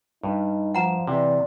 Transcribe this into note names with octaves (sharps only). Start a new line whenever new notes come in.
G2 D#4
F3 F#5 A#5
C3 E3 D5